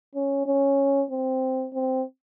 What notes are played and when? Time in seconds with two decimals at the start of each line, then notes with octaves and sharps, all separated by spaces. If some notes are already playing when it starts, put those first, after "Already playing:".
0.15 C#4
0.46 C#4
1.10 C4
1.74 C4